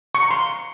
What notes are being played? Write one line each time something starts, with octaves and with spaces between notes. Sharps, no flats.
C#6
A#5
C6